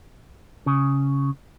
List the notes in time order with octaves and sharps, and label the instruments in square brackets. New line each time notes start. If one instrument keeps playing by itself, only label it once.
[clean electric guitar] C#3